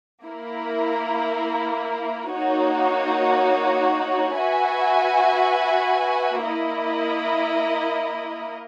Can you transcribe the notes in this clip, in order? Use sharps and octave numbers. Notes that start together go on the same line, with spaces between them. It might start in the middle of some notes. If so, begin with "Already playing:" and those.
A#3 E4 A#4
A#3 D#4 F#4 C#5
F#4 B4 E5 G#5
A#3 E4 A#4 D#5